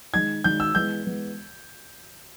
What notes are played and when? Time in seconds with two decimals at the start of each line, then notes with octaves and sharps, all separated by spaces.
0.14 D#3 G#3 D#4 G#6
0.44 D#3 G#3 D#4 G6
0.60 E6
0.75 E3 G#3 B3 G6
1.06 E3 G#3 B3